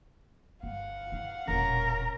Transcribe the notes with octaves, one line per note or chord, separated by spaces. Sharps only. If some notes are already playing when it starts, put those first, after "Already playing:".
G1 F5 F#5
E4
E1 A#2 C#4 A#4